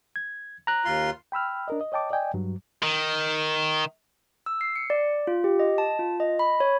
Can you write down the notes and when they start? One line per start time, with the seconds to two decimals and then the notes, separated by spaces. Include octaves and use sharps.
0.16 G#6
0.67 A#5 F#6
0.85 D#2 F4 C6
1.32 G5 B5 E6 F6
1.68 D4 A#4 D#5
1.81 D#5
1.92 C#5 D#5 G5 A5 D6
2.11 D5 D#5 G5 G#5
2.34 G2 F#3
2.83 D#3
4.46 E6
4.61 C7
4.76 C#7
4.90 D5
5.27 F4
5.44 G4
5.59 D#5
5.78 A5
5.99 F4
6.20 D#5
6.39 B5
6.60 C#5